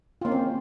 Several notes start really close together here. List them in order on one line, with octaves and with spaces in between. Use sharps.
F4 A#3 C#4 C4